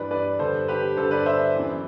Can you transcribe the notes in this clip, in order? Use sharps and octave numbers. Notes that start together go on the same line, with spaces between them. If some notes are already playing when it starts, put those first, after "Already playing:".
Already playing: G2 E3 B4 D5
B4 D5
G2 D3 A4 C5
G4 B4
G2 D3 A4 C5
B4 D5
C5 E5
F#2 E3